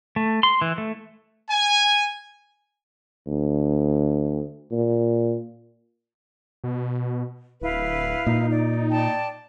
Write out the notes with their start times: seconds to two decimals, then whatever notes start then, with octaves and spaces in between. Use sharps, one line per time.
0.16 A3
0.43 C6
0.61 E3
0.78 A3
1.49 G#5
3.27 D2
4.72 A#2
6.64 B2
7.61 D1 E4 B4 F5
8.27 A#2 D#4
8.49 D5
8.91 D5 G5 A5